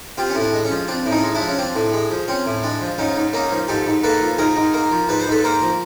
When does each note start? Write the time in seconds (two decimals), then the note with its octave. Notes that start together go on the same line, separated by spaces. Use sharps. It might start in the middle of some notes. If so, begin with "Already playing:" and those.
0.18 C4 F4 G4
0.29 C#4
0.35 A2
0.41 D4
0.53 G#3
0.65 C#4
0.71 F3
0.88 C4 D4
1.06 A2
1.11 C#4 D#4
1.23 G#3
1.35 D4 E4
1.41 F3
1.48 C#4
1.58 C4 D4
1.75 A2
1.93 G#3
2.11 F3
2.28 C4 C#4
2.46 A2
2.63 G#3 D4
2.81 F3
2.98 G#2 C#4 D#4
3.16 G#2
3.33 A#3 C#4 D#4
3.51 F3
3.68 G#2 G4 A4
3.86 G#2
4.03 A#3 A4 B4
4.21 F3
4.38 G#2 G#4 A#4
4.56 G#2
4.74 A#3
4.91 F3
5.09 G#2 B4
5.20 C5
5.27 G#2 A4 B4
5.44 A#3 A#4 C5
5.62 F3